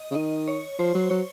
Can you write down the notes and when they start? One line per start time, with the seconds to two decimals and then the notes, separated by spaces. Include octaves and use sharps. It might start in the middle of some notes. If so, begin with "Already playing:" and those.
Already playing: D#5
0.11 C#3
0.15 D#3 D#5
0.48 C#5
0.79 F3 C5
0.95 F#3
1.10 F#3 C#5